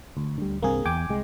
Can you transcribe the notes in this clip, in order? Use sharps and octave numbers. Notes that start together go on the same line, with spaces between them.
D2
D3 G3
C2 G2 A#3 C4 G#4
E2 G5 G#5 D6
C2 G#3